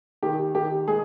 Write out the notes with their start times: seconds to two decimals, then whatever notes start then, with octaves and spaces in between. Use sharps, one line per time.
0.23 D#3 G4
0.55 D#3 G4
0.87 G#3 G#4